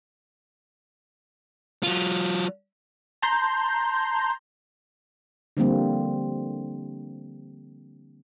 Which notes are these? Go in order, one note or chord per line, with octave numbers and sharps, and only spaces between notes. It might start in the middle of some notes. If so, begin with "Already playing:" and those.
F#3 F4
A5 A#5 C6 G6
D3 F3 G3 A#3 C4